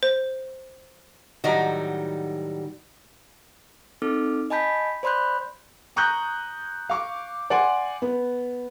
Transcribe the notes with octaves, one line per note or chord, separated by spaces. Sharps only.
C5
A2 D#3 F#3 G3 D#4 F#4
C4 D#4 A4 D6 F6
D#5 G#5 A5 B5 G6 B6
C5 D5 B5 C6 F#6 G6
A#5 C#6 D#6 F#6 G6
F5 C#6 D6
D5 F#5 G#5 C6
B3